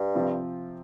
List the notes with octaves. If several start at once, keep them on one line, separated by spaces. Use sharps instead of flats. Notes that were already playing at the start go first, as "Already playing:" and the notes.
Already playing: G2
C3 F3 C4 F4